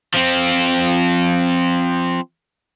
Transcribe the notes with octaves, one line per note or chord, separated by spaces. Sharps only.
F3 C4